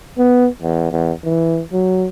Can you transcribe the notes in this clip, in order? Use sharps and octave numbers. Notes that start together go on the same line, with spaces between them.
B3
E2
E2
E3
F#3